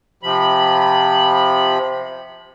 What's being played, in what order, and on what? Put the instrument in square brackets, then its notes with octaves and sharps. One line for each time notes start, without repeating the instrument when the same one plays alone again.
[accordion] C3 F3 B5